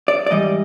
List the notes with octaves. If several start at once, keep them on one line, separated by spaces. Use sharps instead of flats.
D5
D5
G#2 E3 G3 D#5